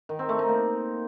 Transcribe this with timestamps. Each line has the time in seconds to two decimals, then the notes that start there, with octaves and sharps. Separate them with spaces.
0.09 D#3
0.19 C4
0.29 A3
0.39 D#4
0.49 A#3